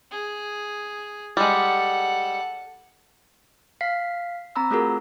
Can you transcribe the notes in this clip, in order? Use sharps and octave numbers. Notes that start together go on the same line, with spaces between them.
G#4
G3 G#3 A4 F#5
F5 B6 C7
C4 A#5 B5 E6
A3 F4 F#4 G#4 A#4